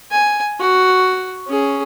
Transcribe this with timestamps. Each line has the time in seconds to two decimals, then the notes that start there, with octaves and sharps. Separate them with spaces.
0.11 G#5
0.60 F#4
1.47 C#4 G#4